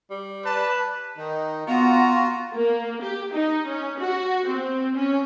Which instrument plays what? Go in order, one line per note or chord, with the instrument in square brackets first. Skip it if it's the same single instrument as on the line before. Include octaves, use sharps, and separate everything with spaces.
[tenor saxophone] G3
[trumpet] B4 [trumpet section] D5 A5
[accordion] D#3 D#4
[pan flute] B3 [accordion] F4 F#4 A#5
[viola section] A#3
G4
D#4
C#4
F#4
C4
C#4